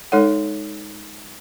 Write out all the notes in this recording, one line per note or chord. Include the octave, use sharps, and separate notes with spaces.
G#3 D#4 A4 C#5 F#5